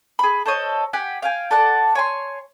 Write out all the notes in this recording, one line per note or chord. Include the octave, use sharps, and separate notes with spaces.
G#4 B5
A4 C5 C#5 D#5
G4 F#5 G#5
F5 G5 G#5
A4 D5 F#5 A5
C#5 G#5 C6